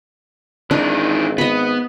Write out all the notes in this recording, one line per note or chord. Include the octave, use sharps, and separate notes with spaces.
G#1 E3 D4 D#4
B3 D#5 B5